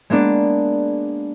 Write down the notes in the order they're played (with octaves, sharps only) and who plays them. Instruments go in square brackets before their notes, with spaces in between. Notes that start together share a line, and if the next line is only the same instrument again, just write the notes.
[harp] G#3 A#3 B3 D4